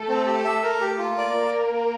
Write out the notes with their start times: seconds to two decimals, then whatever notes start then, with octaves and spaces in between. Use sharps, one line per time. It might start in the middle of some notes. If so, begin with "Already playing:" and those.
Already playing: A3 A4
0.09 C4
0.26 G4
0.45 E5
0.63 A#4
0.81 G4
0.98 A#3 F4 A#4
1.18 D5